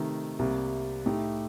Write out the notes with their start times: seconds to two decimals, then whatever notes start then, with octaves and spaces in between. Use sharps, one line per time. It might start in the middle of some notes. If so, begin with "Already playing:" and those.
Already playing: C3 D#3 A3 D#4
0.39 C2 C3 G3 A#3
1.06 A2 A3 D#4 G4